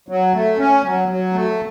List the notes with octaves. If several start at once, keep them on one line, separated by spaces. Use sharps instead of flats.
F#3
A3
C#4
F#3
F#3
A3